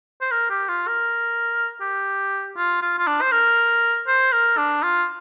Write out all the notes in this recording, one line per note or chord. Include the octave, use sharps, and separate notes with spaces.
C5
A#4
G4
F4
A#4
G4
F4
F4
F4
D4
C5
A#4
C5
A#4
D4
F4